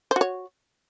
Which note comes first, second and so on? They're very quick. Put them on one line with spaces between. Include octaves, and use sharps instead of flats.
C5 F#4 C#5